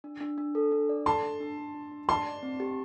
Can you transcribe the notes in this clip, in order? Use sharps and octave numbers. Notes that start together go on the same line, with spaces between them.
D4
D4
D4
A4
D4
D5
A4 A5 C6
D4
D4
D4
D4
D4
D5 A5 C6
D5
C4
G4